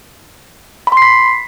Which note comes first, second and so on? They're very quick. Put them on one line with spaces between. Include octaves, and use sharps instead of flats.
B5 C6 C7 B6